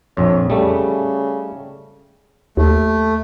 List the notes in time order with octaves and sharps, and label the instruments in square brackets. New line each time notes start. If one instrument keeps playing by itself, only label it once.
[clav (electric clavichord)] A#1 F2 [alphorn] C#5
[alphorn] C#3 [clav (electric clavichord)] G3 A3
[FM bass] D#2 [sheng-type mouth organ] A3